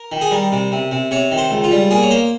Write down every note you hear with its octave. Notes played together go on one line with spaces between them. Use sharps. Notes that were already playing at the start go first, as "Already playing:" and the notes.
Already playing: A#4
D#3
G#4
G3 A#4
C3
C3
C3
C3 C#5
D#3
C5
C#2
F4
G3
A#3 G#4
C#5
A#3 C5